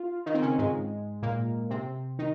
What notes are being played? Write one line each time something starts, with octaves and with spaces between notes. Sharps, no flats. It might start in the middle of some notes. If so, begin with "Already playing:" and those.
Already playing: F4
D#3 D#4
C4
C#3 C#4
G#2 G#3
A#2 A#3
C3 C4
D#3 D#4